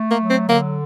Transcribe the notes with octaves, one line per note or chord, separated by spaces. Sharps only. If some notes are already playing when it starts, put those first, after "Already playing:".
Already playing: A3
A#3
F#3
C4
D3 A#3